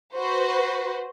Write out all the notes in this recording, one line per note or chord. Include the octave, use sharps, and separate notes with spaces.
F#4 B4 C5